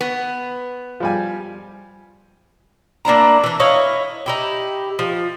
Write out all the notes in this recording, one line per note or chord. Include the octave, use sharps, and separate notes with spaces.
B3
F3 G3 G#5
A#3 D4 E4 A#5
E3 D4
E4 C#5 D#5 F5
D#4 E4 G4
F3